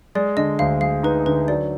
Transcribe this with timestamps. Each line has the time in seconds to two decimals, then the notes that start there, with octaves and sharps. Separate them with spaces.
0.15 G#3 D5
0.37 D3 D#5
0.59 D2 F5
0.81 G#3 F5
1.03 D#4 B4
1.26 D3 B4
1.48 F#3 D5